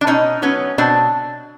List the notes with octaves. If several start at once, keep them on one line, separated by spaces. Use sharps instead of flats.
D4
B2 C#4 D#4
F#3 B3 C#4
B2 C4 D4